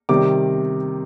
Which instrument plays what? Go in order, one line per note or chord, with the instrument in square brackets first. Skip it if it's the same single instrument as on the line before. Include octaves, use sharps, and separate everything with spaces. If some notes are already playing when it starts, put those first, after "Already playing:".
[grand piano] C3 D#3 G3 D6